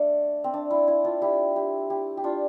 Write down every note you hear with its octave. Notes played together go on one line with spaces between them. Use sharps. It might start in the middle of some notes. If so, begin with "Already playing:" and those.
Already playing: A3 D4
C4
D4
E4
E4
D4 F4
E4 G4
E4 G4
E4 G4
G4
D4 F4